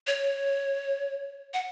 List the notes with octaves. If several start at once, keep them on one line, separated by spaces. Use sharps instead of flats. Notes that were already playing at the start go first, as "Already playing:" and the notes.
C#5
F#5